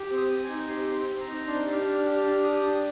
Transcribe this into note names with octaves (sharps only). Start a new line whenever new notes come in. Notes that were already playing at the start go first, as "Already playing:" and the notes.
Already playing: G4
C4
D#6
C4
G#5
D#4
G4 C6
C4
C6
C4
A#5
D#4
D4 C6
G4
F6
D4
F6
G4
D4 F6
G4 D#6
D4 D#6